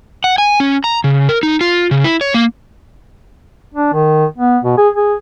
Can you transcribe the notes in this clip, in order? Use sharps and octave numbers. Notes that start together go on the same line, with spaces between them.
F#5
G#5
C#4
A#5
C#3
A#4
D#4
F4
C#3
E4
C#5
A#3
D4
D#3
B3
B2
G#4
G#4